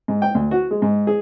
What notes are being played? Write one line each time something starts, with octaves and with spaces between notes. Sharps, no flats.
G#2
G5
D2
F#4
G#3
G#2
G#4